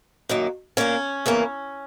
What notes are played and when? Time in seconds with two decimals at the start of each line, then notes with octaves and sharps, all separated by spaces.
0.29 F#2 D#3 A#3
0.77 A#2 A#3 C#4
1.26 E2 C#3 E3 A#3